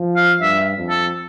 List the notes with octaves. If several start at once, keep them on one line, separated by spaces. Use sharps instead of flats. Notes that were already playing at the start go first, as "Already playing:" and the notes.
Already playing: F3
F5
G2 E5
F2
A4